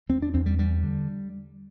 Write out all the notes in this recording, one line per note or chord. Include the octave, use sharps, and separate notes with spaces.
E2 C4
D4
E2 C4
G3
E2 G3
D3